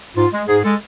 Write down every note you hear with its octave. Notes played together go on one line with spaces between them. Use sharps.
G#2 F4
G#3
G#2 G#4
G#3 A4